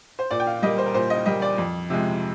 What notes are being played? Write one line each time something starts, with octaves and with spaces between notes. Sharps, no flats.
C5
A#2 D5
G5
F5
G3 A#3 D#5
C5
A#4
A#2 C5
D#5
G3 A#3 D#5
D5
F2
C3 F3 G#3